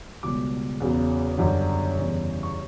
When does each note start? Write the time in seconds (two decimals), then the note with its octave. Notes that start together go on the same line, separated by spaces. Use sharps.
0.23 C#2 B2 G3 D6
0.80 E2 C#3 F#3
1.38 F#2 D3 G3
1.96 E2 C#3 E3 G3
2.43 C#6